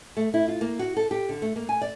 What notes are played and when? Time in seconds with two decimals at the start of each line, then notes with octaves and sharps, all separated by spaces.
0.17 A3
0.34 E4
0.48 F4
0.61 A#3
0.79 F#4
0.97 A4
1.11 G4
1.29 D3
1.42 A3
1.56 A#3
1.69 G#5
1.82 D5